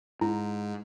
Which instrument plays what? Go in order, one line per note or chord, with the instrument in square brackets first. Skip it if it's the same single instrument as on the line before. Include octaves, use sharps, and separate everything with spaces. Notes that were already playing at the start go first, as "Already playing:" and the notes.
[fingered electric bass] G#2 [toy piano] E4